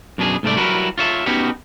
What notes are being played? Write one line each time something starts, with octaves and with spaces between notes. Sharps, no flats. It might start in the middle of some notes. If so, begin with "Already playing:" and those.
F#2 B2 D4 G#4
C2 G#2 A3 C4 D5
F#3 G3 E4 F#4 A#4 B4
F4 C#5 E5
B3 C#4 D#4 F#4 G4 C#5